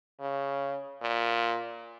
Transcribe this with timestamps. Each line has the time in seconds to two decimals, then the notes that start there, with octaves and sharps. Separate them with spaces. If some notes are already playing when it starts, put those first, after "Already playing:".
0.20 C#3
1.02 A#2